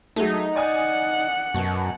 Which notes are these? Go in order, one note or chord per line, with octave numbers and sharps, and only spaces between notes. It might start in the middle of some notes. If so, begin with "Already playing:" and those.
F#3 G#3 A3 D#4
D5 F#5 G#5 D#6
F#2 B2